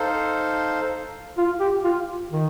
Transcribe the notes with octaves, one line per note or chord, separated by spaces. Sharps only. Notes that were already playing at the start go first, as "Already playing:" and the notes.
Already playing: D#4 A4 C5 F5
F4
G4
F4
D#3